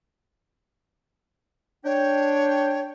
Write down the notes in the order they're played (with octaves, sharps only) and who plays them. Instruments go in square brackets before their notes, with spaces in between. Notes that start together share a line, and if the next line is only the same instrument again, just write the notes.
[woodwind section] D4 G5 [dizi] C#5